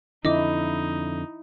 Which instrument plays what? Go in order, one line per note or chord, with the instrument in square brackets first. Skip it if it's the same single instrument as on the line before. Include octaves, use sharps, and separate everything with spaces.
[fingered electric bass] F2 D3 [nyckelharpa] D#4 [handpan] E4 [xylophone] D#5 D6